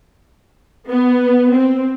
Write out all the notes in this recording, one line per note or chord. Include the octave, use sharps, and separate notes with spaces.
B3
C4